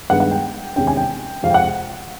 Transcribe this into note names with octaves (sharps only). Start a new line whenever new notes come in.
G2 D#3 G#3 B3 F#5
F#5
G5
E2 C3 D#3 G#3 C#4 G5
G#5
G5
F2 C3 F3 G#3 C4 F5
G5
F#5